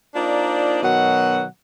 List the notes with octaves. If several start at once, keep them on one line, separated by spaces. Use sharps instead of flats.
A#3 D4 D#4 F4 C5 D5
B2 D#3 F#3 F#5